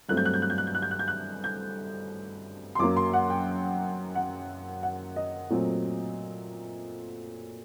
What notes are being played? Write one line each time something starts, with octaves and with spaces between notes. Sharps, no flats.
G2 F#3 A3 C4 F#6
G6
F#6
G6
F#6
G6
F#6
G6
F#6
G6
F#6
G6
F#6
G6
C6
F#2 F#3 A#3 D6
C6
F#5
G5
F#5
F#5
D#5
A#2 F#3 A3 C4